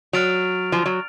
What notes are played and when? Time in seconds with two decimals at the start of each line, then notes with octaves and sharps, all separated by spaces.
0.13 F#3 F6 A6 D7 F7
0.72 F3
0.86 F#3